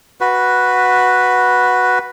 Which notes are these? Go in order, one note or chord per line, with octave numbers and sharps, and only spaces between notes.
F#4 B4